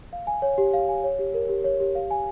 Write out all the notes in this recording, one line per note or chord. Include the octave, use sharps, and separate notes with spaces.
F5
G#5
C#5
G4
F5
G#5
C#5
G4
A#4
G4
C#5
G4
F5
G#5